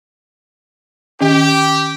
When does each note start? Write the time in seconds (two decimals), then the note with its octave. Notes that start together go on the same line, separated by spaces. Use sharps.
1.21 D#3 C#4 G4